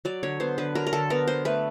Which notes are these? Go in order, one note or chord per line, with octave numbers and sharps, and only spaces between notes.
F#3 D5
D3 C#5
B3 C5
D3 B4
F#3 A#4
A#4
D3 A4
B3 A#4
D3 C5
A3 B4